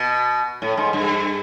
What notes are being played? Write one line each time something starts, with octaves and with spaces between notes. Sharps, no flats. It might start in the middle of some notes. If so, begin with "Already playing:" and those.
Already playing: B2
A2
G#2
G2